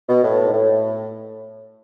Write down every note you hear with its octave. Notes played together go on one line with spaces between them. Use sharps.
B2
A2
G#2
A2